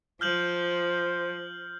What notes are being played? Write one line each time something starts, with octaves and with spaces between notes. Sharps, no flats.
F3 C5 F6 G6 F#7